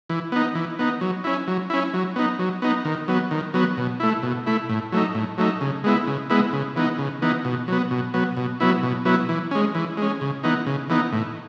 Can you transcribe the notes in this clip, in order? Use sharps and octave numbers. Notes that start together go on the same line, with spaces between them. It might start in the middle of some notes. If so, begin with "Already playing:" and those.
E3
B3 D#4
E3
B3 D#4
F#3
C#4 E4
F#3
C#4 E4
F#3
B3 D#4
F#3
B3 D#4
D#3
F#3 B3
D#3
F#3 B3
B2
A3 E4
B2
A3 E4
A2
F#3 A3 D#4
A2
F#3 A3 D#4
C#3
G#3 B3 E4
C#3
G#3 B3 E4
C#3
E3 B3 D#4
C#3
E3 B3 D#4
B2
F#3 B3
B2
F#3 B3
B2
F#3 B3 E4
B2
F#3 B3 E4
E3
G#3 C#4
E3
G#3 C#4
C#3
E3 B3 D#4
C#3
E3 B3 D#4
A2